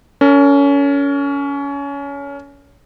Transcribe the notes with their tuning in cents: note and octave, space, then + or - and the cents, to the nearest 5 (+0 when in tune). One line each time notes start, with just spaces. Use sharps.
C#4 +25 A#4 -30